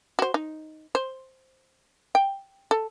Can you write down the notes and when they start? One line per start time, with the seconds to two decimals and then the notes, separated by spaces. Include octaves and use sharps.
0.19 F#4 C5
0.34 D#4
0.95 C5
2.15 G5
2.71 A4